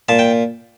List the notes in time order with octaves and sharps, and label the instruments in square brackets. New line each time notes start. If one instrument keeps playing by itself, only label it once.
[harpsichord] A#2 A5
G5